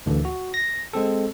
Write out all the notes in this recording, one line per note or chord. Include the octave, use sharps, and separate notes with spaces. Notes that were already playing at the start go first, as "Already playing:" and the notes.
D2 A2 D3 E3
F#4
A#6
G#3 C4 A4